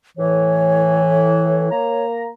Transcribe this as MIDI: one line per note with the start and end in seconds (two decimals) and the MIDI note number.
0.18 1.66 45
0.18 1.66 52
0.18 2.05 73
1.71 2.27 58
1.71 2.27 82